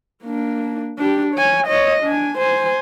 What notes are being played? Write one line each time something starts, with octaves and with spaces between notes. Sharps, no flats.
A#3 D4
D4 G4
C#5 G#5
C#5 D#5
D4 G#5
C5 G#5